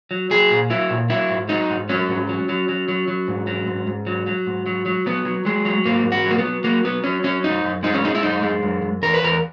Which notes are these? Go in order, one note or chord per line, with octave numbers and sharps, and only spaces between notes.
F#3
F#3 G#4
A#2
F#3 E4
A#2
F#3 E4
G#2
F#3 D#4
G#2
F#3 C#4
G#2
F#3
F#3
F#3
F#3
F#3
G#2
F#3
G#2
G#2
F#3
F#3
G#2
F#3
F#3
F#3 B3
F#3
F#3 G#3
F#3
G#2 A#3
G#2
F#4
F#3
A#3
B3
F#3
F#3 A#3
F#3 B3
F#3 C#4
F#3 C#4
F#2 D#4
F#2
G#3 D#4
C#4
G#3 D#4
E4
F#2 D#4
G#3
F#2
F#2
E2 A#4
B4
E2 A#4